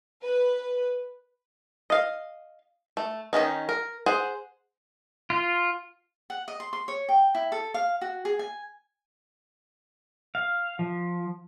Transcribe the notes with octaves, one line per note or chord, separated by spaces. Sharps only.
B4
D#5 F5
A3
D#3 F3 C#4 D#4
A#4
G#4 C5 F#5
F4
F#5
D#5
C6
C6
C#5
G5
E4
A4
F5
F#4
G#4
G#5
F5
F3